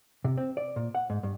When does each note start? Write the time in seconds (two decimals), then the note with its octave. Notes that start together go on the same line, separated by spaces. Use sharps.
0.24 C3
0.38 C4
0.57 D5
0.76 A#2
0.95 F#5
1.10 G#2
1.23 G2